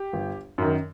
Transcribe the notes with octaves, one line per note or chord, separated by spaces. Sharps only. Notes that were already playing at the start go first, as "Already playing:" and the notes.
Already playing: G4
G1
F#2 D#3